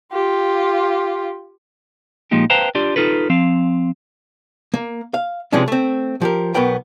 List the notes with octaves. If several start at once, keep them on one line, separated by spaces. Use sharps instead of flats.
F4 G4
A#2 F3 G#3 A#3 D#4 G4
B4 C5 F5 G5 A5 A#5
D4 F4 G4 D5
D#4 F4 A4 B4
F3 C4 F5
A#3
F5
C3 E3 F3 G#3 C#4 D4
A3 C4
F3 G4 A#4
B1 F#3 B3 A#4 G5 B5